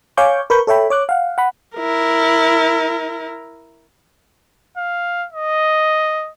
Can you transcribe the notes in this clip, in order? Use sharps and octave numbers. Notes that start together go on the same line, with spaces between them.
C#5 F5 G#5 C#6 D6 G6
A#4 B4 B5 C#6 G6
A4 C#5 E5 G5 B5
C#5 D6 F#6
F5 F#5
F#5 B5
E4 A#4
F5
D#5